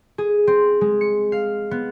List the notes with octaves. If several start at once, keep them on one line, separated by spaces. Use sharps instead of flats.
G#4
C4
G#3
C#7
F5
B3